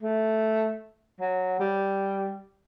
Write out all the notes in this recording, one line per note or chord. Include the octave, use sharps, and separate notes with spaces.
A3
F#3
G3